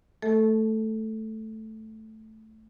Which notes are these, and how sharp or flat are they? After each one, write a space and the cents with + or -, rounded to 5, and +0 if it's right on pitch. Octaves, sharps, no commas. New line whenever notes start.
A3 +0 A4 +0 E5 -30